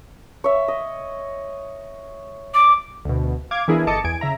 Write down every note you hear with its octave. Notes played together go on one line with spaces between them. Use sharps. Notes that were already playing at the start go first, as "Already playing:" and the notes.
C#5 E5
D#5
D6
D2 B2
F5 D6 G#6
E3 B3 D4 E4 G#4 A#4
G1 A4 D#5 A5 D6 C#7
E2 G#5 G#6 D7
C#3 E5 A#5